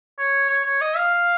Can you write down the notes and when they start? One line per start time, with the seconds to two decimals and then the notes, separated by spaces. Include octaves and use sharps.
0.18 C#5
0.50 C#5
0.66 C#5
0.81 D#5
0.97 F5